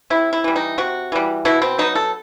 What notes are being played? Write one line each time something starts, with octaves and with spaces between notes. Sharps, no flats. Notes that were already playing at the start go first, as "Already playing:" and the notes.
C3 E4
E4
E3 G3
D#4
C3 F#4
E3 G3
B2 E4
C4
F#3 B3 D#4
A4